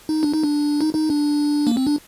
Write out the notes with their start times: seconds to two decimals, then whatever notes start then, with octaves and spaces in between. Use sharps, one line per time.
0.09 D#4
0.23 D4
0.34 D#4
0.44 D4
0.81 D#4
0.95 D#4
1.10 D4
1.67 A#3
1.77 C4
1.87 D4